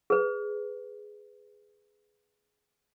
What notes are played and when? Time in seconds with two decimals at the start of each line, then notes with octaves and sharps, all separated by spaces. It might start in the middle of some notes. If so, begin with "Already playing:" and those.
0.10 G#4 B4